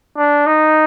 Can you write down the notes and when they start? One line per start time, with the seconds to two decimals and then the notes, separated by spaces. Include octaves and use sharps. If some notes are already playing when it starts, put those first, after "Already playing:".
0.18 D4
0.47 D#4